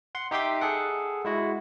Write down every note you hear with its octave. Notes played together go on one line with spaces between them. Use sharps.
F#5 C6
D#4 G4 E5 G5 C6 D6
G#4 A4 F#5
G#3 E4 F#4